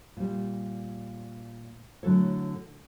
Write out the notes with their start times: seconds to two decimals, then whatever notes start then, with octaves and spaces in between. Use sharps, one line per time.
0.17 A#2 G3
2.03 A2 D3 F#3 F#4 A4 C#5